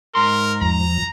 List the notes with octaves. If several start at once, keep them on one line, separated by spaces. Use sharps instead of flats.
G#2 A#4 C6
E2 F3 A#5